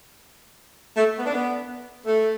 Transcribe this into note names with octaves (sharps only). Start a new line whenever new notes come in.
A3
B3
D4
B3
A3